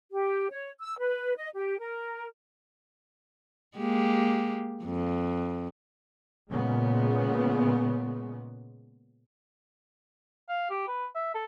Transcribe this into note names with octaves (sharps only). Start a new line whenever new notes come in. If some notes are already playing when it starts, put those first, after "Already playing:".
G4
C#5
E6
B4
D#5
G4
A#4
G#3 A#3 G4
F2
A#2 C#3 G#3 B3
F5
G4
B4
E5
A4